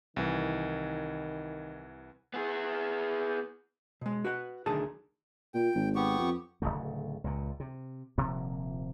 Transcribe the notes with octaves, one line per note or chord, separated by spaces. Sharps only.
C2 D#3 E3
B3 G#4
B2 G#3
F#4 B4 F#5
B1 D3 D#3 A3 G#4 A5
A#2 G5
G#1
B3 G4 C#6
F2
D1 F2 C#3 A3
C#2 A#2
C3
D#1 C3 F3 A#3